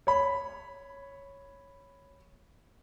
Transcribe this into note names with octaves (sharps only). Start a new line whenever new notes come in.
C#5 B5